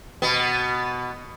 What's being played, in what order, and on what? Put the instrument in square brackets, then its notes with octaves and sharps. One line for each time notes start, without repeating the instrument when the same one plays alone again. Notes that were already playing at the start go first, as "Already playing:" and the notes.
[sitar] B2 B3